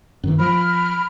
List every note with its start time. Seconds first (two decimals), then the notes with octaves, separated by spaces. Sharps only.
0.23 F#2 D#3 E3
0.39 F3 B5 F6